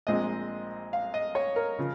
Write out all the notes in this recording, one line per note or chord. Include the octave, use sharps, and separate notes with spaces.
A#1 A#2 G#3 C4 D#5
F5
D#5
C#5
A#4
C#3 F3